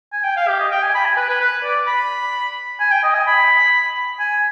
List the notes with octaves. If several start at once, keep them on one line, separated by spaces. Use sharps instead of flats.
G#5
G5
F5
G4
D#5
G5
G#5
B5
G#5
B4
B4
B4
D5
B5
G#5
G5
D#5
G#5
B5
G#5